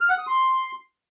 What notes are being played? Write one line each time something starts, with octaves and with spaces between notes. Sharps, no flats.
F6
F#5
D#6
C6